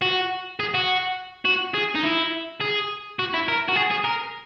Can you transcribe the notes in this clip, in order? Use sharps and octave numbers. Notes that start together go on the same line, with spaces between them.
F#4
G#4
F#4
F#4
G#4
D#4
E4
G#4
F#4
E4
A#4
F#4
G#4
G#4
A#4